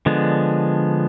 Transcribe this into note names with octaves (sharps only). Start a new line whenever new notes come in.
D3 F3 G#3 B3 D4